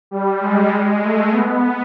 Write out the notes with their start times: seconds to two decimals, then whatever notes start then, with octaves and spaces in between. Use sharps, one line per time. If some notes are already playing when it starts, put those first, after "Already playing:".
0.11 G3
0.41 G#3
0.71 G#3
1.02 A3
1.32 B3